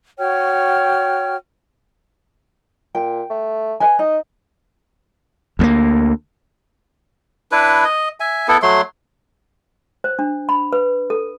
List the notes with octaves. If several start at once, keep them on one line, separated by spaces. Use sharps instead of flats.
F#4 C#5 G5 F6
A#2 G5
A3
B4 D#5 G#5
D#4 D#5
D2 A3 A#3
D4 E4 B4
D#5
E5 G#5
B3 E4 A4
F#3 A3 C6
C5
D4
B5
B4
A4